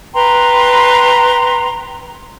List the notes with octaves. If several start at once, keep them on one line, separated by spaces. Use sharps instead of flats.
B4 G5 A#5 C6